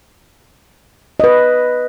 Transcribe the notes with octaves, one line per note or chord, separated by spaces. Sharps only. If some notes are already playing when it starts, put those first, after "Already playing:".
B4 D#5